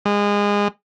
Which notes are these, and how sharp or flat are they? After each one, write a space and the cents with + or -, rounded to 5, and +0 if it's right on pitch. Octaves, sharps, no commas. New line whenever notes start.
G#3 -25